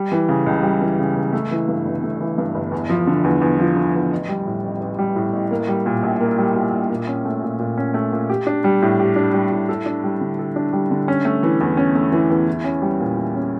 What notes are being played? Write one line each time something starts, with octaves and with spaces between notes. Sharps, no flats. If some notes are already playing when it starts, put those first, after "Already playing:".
Already playing: G3
E3
C#3
C#2
G3
E3
C#3
C#2
A3
E3
G2
G1
A3
E3
G2
G1
E2
F3
D3
E2
E2
F3
D3
E2
A1
G3
A2
A1
A1
G3
A2
A1
A#3
G3
A#2
A#1
A#3
G3
A#2
A#1
A#2
C#4
A3
A#2
A#2
C#4
A3
A#2
G4
D4
G3
A2
G4
D4
G3
A2
A4
D4
G3
D3
A4
D4
G3
D3
C#4
A3
E3
E2
C#4
A3
E3
E2
E4
C#4
G3
A#2
E4
C#4